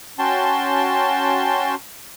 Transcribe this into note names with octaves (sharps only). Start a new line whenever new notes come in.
C#4 F#4 G5 A5 C6